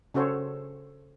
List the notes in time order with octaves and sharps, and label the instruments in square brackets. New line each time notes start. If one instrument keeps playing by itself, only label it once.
[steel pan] C#3 C#4 F#4 A4 C5 C#5